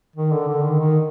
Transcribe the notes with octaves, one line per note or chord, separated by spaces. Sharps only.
D#3
D3
D3
D#3
D#3